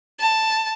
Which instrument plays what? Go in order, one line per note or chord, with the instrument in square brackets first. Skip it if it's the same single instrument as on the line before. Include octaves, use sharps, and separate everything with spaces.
[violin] A5